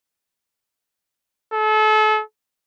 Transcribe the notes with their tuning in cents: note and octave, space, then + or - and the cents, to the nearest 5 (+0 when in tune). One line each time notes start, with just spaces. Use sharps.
A4 -35